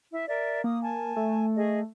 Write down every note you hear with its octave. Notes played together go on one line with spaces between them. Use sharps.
E4 E5
A#4 D5 E5
A#3 D#6
G#5 A5
A3
G#4 D#5